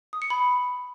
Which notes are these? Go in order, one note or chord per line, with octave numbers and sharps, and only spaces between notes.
D#6
C#7
B5